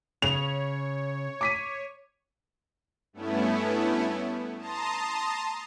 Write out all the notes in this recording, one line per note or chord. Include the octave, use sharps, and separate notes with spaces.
C#3 C#5 F7
D6 B6 D#7
G2 A3 B3 C#4 E4
A5 A#5 C6 D#6